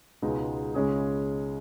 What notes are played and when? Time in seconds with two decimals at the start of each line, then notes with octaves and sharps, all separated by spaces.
0.22 C#2 B2 G#3 B3 D#4
0.74 C#2 C#3 G#3 C#4 G#4